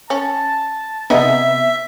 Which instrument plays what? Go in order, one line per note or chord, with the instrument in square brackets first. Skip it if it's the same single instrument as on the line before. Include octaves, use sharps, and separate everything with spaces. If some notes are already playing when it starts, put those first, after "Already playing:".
[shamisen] C#4 [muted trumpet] A5
[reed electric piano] C3 B3 [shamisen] D#4 G#4 D#5 [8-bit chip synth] E5